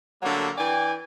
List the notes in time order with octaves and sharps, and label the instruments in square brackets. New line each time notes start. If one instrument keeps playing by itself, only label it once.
[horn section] D3 F#3 G3 A3 A#3
E3 D5 G5 G#5